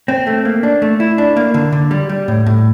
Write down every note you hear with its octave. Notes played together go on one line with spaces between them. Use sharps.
C4
A3
A#3
D4
A3
E4
D4
A#3
D3
D3
G3
G3
A2
A2